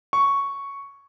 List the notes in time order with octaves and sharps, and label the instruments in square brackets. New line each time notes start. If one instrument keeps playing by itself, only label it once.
[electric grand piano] C#6